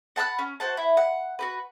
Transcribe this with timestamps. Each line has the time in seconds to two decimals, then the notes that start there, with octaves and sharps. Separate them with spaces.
0.16 F#5 A5 B5 F#6
0.39 C#4
0.60 F#4 C5 F#5 A5
0.77 E4
0.97 F#5
1.39 F#4 G4 B4